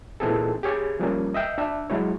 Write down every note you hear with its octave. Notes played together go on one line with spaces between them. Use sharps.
A#2 E3 C4 D#4 G#4 A4
G4 G#4 C#5 G#5
F3 G3 A#3 C#4
D#5 E5 G5
D4 E5
F#3 G#3 E4 C#5